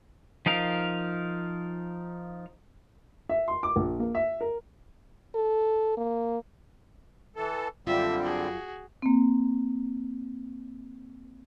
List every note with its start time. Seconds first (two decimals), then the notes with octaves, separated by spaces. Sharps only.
0.46 F3 D#4 A#4 F5
3.29 E5
3.48 C6
3.63 D6
3.76 A#1
4.00 A#3
4.15 E5
4.41 A#4
5.34 A4
5.97 A#3
7.36 E3 A4
7.87 F#2 D3 G3 C4 F4 E5
8.23 F#4 G#4
9.02 A#3 C4